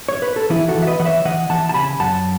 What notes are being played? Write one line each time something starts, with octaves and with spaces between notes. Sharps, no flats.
C#5
B4
A4
E3 E4 G#4
F#4 A4
E3
E5
B4 D#5
E3 F#5
C#5 E5
E3 D#5 F#5
E3 F#5 A5
A5
C#3 G#5 B5
F#2 F#5 A5